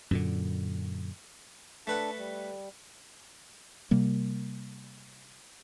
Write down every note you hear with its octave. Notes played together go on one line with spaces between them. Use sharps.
F#2 A#2 D3
A3 D4 A4 B4 F#5 A5
G3
C3 G3 A#3